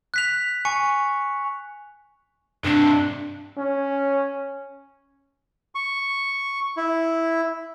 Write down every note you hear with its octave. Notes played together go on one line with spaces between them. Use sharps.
F#6 B6 F7
G#5 C#6 C#7
G2 C3 D4
C#4
C#6
E4